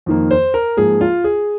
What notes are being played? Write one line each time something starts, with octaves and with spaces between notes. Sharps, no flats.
F2 D#3 A#3
C5
A#4
G#2 F3 A#3 G#4
F4
G#4